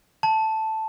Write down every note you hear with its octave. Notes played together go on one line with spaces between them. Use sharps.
A5